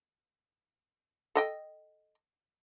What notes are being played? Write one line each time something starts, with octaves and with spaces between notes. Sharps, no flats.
A4 D#5 G5